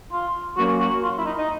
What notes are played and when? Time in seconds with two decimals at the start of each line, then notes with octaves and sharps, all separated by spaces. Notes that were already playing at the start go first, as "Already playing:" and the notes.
0.12 F4
0.57 F#3 A#3 C#4 F#4
0.80 F#4
1.03 F4
1.18 E4
1.25 D#4
1.38 D#4